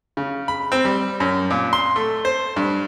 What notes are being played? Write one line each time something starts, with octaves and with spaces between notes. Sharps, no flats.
C#3
B5
C4
G3
F#2
A#2
C6
A3
C5
G2